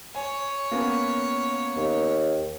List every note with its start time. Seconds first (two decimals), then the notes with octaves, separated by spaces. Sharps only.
0.15 C#5 G#5
0.71 A#3 B3 C#4
1.77 D#2